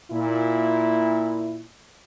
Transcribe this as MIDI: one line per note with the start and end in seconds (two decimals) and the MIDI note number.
0.11 1.64 46
0.11 1.64 64